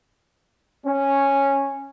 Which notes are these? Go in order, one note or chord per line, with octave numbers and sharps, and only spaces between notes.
C#4